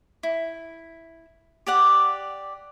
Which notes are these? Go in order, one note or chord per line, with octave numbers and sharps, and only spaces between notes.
E4
G4 D5 F#5